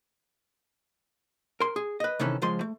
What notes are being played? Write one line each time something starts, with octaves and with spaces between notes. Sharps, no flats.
A#4 C6
G#4
B4 D#5
C3 D#3 E3 C#4 A4 B4
C#2 F3 G#3 C6
A3